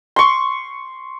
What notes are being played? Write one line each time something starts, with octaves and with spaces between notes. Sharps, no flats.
C6 C#6